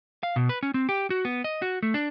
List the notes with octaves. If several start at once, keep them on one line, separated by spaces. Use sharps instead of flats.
F5
B2
B4
C#4
C4
G4
F#4
B3
D#5
F#4
A3
D4